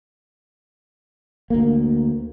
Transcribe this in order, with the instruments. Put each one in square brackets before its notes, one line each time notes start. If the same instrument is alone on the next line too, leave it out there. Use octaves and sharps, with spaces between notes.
[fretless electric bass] D2 A#3